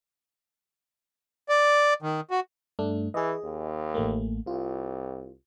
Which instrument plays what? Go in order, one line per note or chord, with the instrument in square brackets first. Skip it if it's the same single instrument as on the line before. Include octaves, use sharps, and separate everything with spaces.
[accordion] D5
D#3
F#4
[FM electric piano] G2 A3 D4
[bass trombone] E3 [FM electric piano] G#4 D#5
[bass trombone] D#2
[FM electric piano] A1 A3 A#3
[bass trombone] C2 [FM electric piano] F4